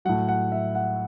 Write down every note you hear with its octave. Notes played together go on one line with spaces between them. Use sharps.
A2 F#3 F#5
F#5
E5
F#5